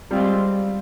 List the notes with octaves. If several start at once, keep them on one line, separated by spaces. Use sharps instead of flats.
G3 G#3 C4 F4